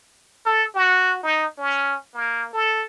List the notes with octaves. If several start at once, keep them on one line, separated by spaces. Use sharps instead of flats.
A4
F#4
D#4
C#4
A#3
A4